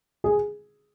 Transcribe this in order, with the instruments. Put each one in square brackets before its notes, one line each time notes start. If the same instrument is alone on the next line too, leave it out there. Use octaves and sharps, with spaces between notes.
[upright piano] G#4